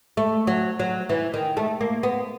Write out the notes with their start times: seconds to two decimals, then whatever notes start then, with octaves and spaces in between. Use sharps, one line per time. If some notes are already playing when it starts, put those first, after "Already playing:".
0.17 A3
0.47 F#3
0.80 F#3
1.09 E3
1.34 D#3
1.57 A3
1.81 A#3
2.03 B3